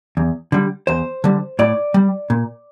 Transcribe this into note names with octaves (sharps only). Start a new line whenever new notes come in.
E2
D3 G3
E2 C5
D3 G3
A2 D5
G3
A#2